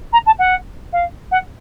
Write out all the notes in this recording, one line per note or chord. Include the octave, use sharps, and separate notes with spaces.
A#5
A5
F#5
F5
F#5